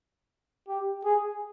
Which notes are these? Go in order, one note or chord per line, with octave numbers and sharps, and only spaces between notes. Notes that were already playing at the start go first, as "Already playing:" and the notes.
G4
G#4